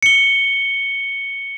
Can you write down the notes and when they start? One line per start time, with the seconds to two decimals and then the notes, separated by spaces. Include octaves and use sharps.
0.03 C#7 G7